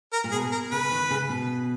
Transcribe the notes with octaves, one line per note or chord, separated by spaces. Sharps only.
A#4
A#2
B2 G#4
A#4
C#3 B4
D#3
C#3
B2